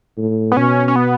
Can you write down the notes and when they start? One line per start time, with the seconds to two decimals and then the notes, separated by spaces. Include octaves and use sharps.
0.17 A2
0.52 B3
0.57 B2 C#4
0.88 C#4
0.96 B3